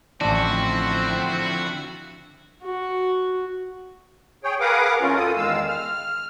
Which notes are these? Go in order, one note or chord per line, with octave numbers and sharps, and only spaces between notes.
A1 D3 F3 C4 D4 E4 F#4
F#4
G#4 C#5 G5
G#4 A#4 B4 F5 F#5 D6
B2 E3 C4 C#4 F4 A#4
F#2 F4 A4 D#6
E2 D#3 G#3 F5 E6
F6